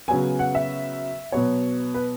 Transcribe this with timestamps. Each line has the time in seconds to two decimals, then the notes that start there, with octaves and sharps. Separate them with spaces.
0.08 C#3 F#3 B3 G#5
0.39 F#5
0.55 E5
1.32 B2 F#3 B3 C#5
1.94 B4